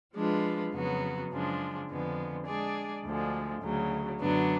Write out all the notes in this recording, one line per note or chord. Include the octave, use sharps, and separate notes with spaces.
F3 G#3 D4 F4 B4
F2 C#3 F#3 B3 F#4
F#2 C#3 F3 G#3 D4
F2 D3 F3 G#3 B3
G#3 D4 G#4 D5
D2 D3 F3 G#3
D2 C#3 F#3
F#2 D3 F#3 B3 D4